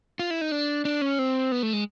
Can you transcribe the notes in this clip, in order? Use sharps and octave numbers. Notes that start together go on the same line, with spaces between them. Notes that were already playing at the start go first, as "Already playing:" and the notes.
F4
E4
D#4
D4
D4
C#4
C4
B3
A3
G#3